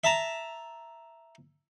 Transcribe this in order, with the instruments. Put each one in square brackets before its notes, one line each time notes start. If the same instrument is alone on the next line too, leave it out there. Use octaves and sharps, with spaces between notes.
[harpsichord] E5 A5 A#5